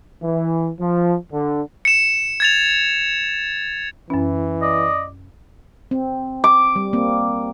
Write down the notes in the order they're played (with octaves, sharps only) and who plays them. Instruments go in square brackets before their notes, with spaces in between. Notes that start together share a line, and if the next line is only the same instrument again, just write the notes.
[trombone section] E3
F3
D3
[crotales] C#7 E7
G#6 A6 F7
[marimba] F#2 C#4 [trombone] E3
[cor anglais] D5 [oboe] D#5
[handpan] C4
[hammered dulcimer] D6
[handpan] G3
A#3 C4